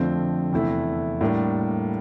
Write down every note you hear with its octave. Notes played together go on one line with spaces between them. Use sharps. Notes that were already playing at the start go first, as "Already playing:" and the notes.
Already playing: F2 D3 F3 A3 C4
E2 C3 E3 A3 E4
A2 G3 A#3 D4